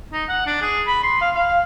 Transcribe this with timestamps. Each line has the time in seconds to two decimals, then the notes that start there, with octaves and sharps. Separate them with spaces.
0.13 D#4
0.29 F#5
0.46 D4
0.62 G#4
0.87 B5
1.03 C6
1.21 F5
1.35 F5